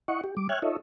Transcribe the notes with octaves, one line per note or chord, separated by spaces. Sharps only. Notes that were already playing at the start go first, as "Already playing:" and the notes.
E4 D#5 F#5 C#6
G4
G3 D6
C#5 E5 G5 F6 F#6 G#6
D#4 F4 A4 C#5 D#5 E5